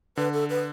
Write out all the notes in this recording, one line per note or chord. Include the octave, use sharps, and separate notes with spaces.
D3 B4
A4
B4